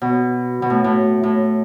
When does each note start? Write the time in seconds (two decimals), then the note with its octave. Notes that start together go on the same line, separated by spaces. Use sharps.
0.02 B2
0.62 B2
0.70 A2
0.84 A2
1.23 A2